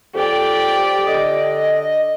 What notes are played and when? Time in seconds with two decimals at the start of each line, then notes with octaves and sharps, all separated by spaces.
0.15 F2 G4 D5 G5
1.07 D3 D#5